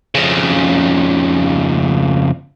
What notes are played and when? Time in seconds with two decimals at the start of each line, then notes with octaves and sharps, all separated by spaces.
0.15 F2 C#3